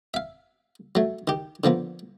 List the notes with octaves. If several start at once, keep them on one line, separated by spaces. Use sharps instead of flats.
E5 F5
F#3 A3
D#3 G4
D3 F3 A#3 B3